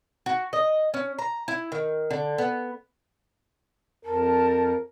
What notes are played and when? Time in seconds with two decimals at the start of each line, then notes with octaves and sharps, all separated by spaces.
0.26 F#4
0.53 D#5
0.94 C#4
1.19 A#5
1.48 E4
1.72 D#3
2.11 D3
2.38 B3
4.05 F2 A#4 A5